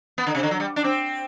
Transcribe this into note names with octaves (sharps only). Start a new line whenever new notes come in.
B3
D3
C3
D3
F#3
G3
D4
C4